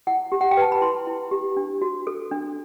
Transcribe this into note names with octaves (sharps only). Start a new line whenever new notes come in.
E4 F#5
G4
F#5
G5
B4 A5
B5
E4 C6
E4
G4
D4
F#4
A4
D4